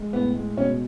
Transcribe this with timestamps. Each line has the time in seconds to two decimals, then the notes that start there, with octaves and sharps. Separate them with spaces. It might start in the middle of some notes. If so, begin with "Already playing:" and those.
Already playing: G#3
0.13 A2 B3
0.35 G#3
0.57 B2 C#4